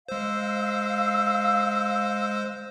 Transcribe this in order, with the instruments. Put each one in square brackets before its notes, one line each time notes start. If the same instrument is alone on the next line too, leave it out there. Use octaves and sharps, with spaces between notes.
[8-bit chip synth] G#3 C5 [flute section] F5 E6